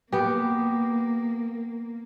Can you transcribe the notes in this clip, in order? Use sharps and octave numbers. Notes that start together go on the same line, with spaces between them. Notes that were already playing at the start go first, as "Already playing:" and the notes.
A#3 B3 G4